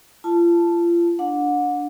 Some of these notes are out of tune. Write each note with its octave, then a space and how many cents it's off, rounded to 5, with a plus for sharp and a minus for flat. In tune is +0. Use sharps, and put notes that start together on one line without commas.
F4 -35 A5 +0
D4 -5 F#5 -35